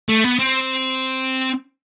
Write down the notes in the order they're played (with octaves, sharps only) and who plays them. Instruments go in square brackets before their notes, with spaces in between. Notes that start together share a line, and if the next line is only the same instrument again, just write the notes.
[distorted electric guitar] A3
B3
C4